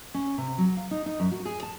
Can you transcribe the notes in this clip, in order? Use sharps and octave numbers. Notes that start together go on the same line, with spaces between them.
C#4
C3
F#3
F5
D#4
D#4
F#2
F#4
G#4
A5